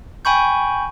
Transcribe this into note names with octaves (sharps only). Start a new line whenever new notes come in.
G5 G#5 B5 C#6 G6